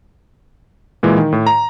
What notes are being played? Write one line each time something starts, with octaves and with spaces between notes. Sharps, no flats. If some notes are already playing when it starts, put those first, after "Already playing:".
A#2 E3 G#3
D#3
A2
A#5